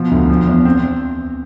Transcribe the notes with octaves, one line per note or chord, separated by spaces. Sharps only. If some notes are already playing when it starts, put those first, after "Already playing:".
Already playing: B2 F3
D2
F3
E2
C4